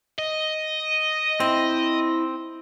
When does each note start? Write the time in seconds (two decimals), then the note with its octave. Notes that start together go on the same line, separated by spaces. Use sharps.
0.19 D#5
1.40 C4 E4